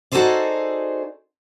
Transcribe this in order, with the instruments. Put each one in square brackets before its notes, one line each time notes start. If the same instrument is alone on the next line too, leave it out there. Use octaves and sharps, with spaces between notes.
[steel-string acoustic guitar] D#4 F#4 G#4 A4 C5 D5